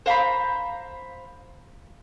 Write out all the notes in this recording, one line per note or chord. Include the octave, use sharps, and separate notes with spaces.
C5 F5 A#5 B5